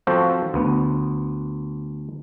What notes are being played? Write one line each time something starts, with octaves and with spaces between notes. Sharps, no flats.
F3 C4 F#4 A4 C5
D2 B3